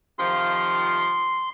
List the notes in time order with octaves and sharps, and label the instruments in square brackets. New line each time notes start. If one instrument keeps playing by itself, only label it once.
[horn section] C3 D#3 F3 [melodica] C6